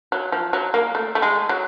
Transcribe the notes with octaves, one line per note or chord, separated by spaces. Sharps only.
F#3
F3
F#3
A#3
A3
A3
G#3
F#3